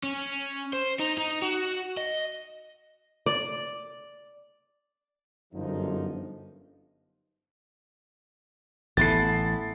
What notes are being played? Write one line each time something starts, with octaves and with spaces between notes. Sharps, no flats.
C#4
C5
D#4
D#4
F#4
D#5
D5
G1 F#2 F3 D#4
A1 B3 E4 A4 A6 C7